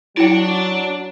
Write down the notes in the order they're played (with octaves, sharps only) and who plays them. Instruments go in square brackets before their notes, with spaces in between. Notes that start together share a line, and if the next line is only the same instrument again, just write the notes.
[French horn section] F#3 [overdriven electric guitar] D4 D5 [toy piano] E4 G5